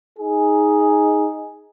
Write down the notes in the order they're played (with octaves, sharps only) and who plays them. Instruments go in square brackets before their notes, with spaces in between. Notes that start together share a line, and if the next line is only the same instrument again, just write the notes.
[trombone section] D#4 G#4